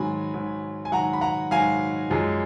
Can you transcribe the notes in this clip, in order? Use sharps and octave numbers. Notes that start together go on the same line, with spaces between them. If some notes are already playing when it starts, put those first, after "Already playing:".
Already playing: G#2 D#3 F#3 G#5 B5
G#2 D#3 F#3
G#5
G#2 D#3 F#3 F#5 A#5
B5
F#5 A#5
G#2 D#3 F#3 F5 G#5
F#2 F3 G#3